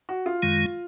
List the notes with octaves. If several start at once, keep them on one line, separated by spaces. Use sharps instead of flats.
F#4
F4
F#2 D#3 G#3